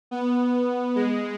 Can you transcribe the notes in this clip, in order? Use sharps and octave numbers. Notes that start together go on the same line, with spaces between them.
B3
G#3